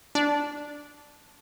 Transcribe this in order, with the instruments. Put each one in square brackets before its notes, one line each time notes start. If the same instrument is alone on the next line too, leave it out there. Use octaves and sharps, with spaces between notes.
[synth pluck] D4